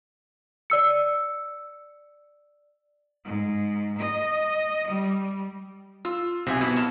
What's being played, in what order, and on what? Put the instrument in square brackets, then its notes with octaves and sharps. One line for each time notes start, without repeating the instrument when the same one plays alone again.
[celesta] D5 E6 C#7
[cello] G#2
D#5
G3
[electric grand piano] F4 [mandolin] E6
[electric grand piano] B1 C3 [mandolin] C4 E4 G#5
[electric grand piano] B2 [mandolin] E4
[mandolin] A#3 A5 F6